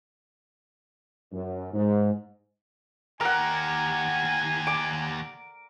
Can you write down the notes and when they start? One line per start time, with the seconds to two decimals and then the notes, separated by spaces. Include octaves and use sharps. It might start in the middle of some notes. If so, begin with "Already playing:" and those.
1.32 F#2
1.73 G#2
3.21 D#2 G4 A#4 F#5 G#5
4.67 D6